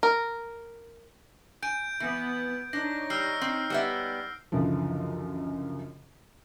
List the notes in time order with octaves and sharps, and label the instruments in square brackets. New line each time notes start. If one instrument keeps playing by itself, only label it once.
[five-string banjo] A#4
[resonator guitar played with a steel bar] G#5 [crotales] G6 D7
[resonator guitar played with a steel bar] E3 [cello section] B3 B4
[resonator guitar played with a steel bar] D4 [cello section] D#4 C#5 [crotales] A#6
[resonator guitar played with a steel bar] G3 [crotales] E6 F6 C7
[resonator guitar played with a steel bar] C4 [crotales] C7
[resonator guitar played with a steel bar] G3 B3 E5
[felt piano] C#2 F#2 D3 E3 F3